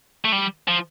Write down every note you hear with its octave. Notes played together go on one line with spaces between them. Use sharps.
A3
G3
F3